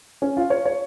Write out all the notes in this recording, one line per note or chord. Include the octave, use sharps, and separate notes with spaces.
C#4
F4
C#5
C#5